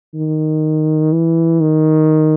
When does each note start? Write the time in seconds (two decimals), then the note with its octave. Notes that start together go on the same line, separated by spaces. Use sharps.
0.14 D#3
1.12 E3
1.61 D#3